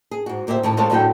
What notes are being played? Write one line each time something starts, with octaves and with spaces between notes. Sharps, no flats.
G#4
G#2 F#4
D2 A#2 G4 C5 E5
A2 D#3 C#5 A5
G#3 A3 C4 F4 A4 C#5
A2 D3 F#3 F#4 A4 G5